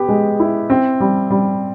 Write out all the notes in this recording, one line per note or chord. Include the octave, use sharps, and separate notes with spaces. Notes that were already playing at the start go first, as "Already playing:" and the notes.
Already playing: B3 G4
G#3
E4
C4
G3
G3